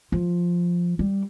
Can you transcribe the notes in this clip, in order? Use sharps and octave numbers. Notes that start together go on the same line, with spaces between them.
F3
G3